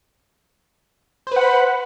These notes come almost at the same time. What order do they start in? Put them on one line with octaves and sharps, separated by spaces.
C5 B4 F#5 B5